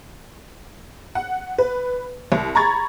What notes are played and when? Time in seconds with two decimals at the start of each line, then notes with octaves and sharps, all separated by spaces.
1.15 F#5
1.58 B4
2.32 C2
2.55 A#5 B5 C#6 G#6 A6